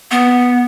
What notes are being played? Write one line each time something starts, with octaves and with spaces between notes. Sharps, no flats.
B3